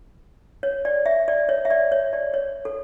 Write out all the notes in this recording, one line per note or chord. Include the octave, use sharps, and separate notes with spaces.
C#5
D5
E5
D5
C#5
E5
D5
C#5
D5
C#5
A4